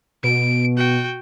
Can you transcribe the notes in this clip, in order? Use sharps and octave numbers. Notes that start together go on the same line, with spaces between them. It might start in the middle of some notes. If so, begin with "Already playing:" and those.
B2 D7
F#4 G5